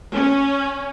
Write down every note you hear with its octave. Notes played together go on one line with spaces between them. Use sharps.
C#4